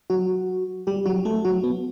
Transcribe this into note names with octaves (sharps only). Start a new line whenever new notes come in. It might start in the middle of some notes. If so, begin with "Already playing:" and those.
F#3 F#4
G3 G4
F#3 F#4
A3 A4
F#3 F#4
B3